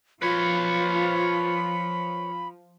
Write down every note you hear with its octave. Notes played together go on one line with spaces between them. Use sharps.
F3 F4 B4 C#5 B5